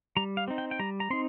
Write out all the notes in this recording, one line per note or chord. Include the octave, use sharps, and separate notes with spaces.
G3 A#5
F5
C4 D#4
G5
G5
G3 A#5
A#5
C4 D#4 C6